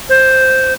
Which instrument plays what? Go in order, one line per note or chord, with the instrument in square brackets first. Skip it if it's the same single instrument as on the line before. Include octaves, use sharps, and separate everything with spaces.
[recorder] C5